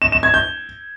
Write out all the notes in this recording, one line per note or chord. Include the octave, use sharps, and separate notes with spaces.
E7
E7
G#6
G6